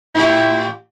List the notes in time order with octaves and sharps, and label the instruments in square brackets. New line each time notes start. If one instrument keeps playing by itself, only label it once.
[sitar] A2 G4 [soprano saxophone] E4